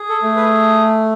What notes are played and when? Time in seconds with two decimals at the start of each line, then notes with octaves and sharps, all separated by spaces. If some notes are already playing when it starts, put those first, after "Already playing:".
Already playing: G#4
0.09 A4
0.23 A3
0.36 B4